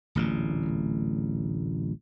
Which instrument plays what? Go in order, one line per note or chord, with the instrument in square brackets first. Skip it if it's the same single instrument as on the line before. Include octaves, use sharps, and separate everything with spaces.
[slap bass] D1 A1 A#2